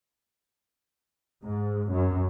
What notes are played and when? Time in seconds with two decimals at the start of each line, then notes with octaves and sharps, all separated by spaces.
1.44 G#2
1.90 F#2